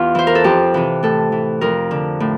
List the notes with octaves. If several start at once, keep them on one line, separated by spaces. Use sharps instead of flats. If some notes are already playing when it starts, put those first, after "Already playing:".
Already playing: E2 F4 G4
E3 C5
A#4
A4
F2 G4
C3 E3
A2 A4
E3
F2 A#4
D3
A2